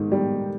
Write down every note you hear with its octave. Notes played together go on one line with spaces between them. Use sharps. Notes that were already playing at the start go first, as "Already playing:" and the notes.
Already playing: G#2 D#3
G3